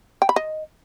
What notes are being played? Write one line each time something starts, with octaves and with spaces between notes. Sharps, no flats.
G5
B5
D#5